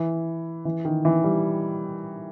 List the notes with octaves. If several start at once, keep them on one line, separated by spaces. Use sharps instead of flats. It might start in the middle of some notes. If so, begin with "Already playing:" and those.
Already playing: E3
E3
D#3
E3
G3